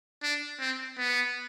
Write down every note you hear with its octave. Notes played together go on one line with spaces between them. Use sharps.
D4
C4
B3